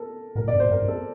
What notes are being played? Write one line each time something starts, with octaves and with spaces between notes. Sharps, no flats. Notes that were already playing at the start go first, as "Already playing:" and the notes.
Already playing: A4 A#4
A2 A#4
A#2
D5
G2
A2 C5
G2 A#4
G2
A4